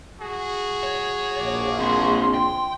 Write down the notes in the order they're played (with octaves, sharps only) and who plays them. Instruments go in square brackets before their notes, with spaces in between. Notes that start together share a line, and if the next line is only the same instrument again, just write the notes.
[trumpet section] F#4 G#4
[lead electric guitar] C#5
[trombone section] A#1 [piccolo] D6
[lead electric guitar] C4 D4 [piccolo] C6
[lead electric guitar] G5